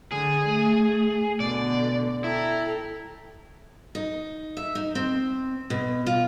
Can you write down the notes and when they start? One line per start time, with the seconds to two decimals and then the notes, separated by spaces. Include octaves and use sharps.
0.12 D3 G#4
0.48 A3
1.40 B2 D3 D5
2.24 E4 A4 G5 A#5
3.95 D#4
4.57 E5
4.75 D#4
4.95 C4
5.70 B2
6.06 F4